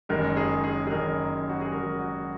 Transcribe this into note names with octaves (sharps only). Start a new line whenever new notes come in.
F#1 F#2 D#3 G#3 A#4
G#4
G#4
G#4
F#1 F#2 D#3 G#3 A#4
F#4
G#4
F#1 F#2 D#3 G#3 A#4
F#4